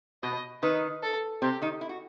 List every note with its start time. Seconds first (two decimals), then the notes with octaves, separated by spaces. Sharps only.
0.23 B2 B3 D#5
0.63 D#3 D#4 B4
1.03 A4
1.42 C3 C4 G4
1.62 D#3 D#4
1.81 E4
1.89 F#4